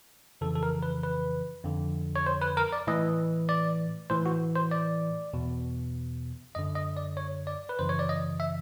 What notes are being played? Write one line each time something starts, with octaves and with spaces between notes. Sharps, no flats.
F2 C#3 E3 A4
A4
A#4
B4
B4
F2 D3
C#5
C5
B4
A#4
D5
A2 E3 D#5
D5
A2 E3 C5
F#4
C5
D5
E2 B2
F#2 D3 D#5
D#5
D5
C#5
D5
B4
F#2 C#3 E3 C5
C#5
D5
D#5
E5